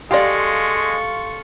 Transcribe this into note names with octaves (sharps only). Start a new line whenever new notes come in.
G#3 G4 A4 D5 F5 C6 C#6 A#6